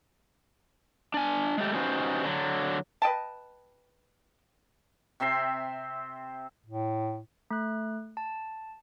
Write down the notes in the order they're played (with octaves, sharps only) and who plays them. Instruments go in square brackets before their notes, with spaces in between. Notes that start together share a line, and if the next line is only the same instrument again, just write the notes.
[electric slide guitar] D4 G#5
G#3 A3 G4
C#4 D#4 F#4 G4 B4 C5
D3 F#3
[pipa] B4 D#5 G5 A5
[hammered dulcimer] C3 C4 E5 C6
[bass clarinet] A2
[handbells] A3 F#6
A5